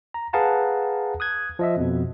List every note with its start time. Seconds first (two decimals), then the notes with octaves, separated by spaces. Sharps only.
0.14 A#5
0.33 G#4 B4 F5 F#5 A5 A#5
1.20 D#6 F#6 G#6
1.59 F3 D#5 E5
1.77 F2 B2